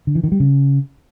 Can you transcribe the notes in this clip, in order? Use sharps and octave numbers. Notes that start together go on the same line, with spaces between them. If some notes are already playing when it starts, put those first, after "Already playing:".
D3
E3
D#3
G3
C#3